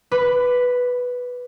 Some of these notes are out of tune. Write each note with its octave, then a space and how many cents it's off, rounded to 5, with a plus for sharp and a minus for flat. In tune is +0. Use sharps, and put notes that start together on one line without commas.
B4 +0 B5 +25 D6 +0